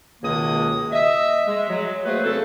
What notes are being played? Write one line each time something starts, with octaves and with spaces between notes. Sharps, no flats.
C#2 B2 D#3 G#3 A#3 D#6
D#5 E5
G#3
F#3
F#3 A3 A#3 G#4 B4 C5
C#3 C4 F#4 A4